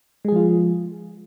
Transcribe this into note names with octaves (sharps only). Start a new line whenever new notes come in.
F3 G#3 F4 G#4